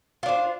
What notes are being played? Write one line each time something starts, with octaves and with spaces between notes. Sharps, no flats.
D4 F4 C5